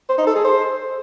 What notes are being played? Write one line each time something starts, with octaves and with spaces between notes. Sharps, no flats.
C5
D#4
A4
G#4
C5